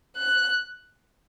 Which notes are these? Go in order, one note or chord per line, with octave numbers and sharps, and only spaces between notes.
F#6